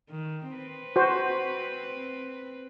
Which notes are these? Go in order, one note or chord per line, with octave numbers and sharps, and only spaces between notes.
D#3
C4 B4
F#4 C5